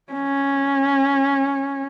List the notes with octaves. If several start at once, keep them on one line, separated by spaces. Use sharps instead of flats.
C#4